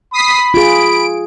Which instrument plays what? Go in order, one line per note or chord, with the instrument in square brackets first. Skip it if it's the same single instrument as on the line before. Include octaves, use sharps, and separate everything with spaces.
[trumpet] B5 [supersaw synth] D#6 B6 C7
[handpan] F4 G#4 [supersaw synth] D7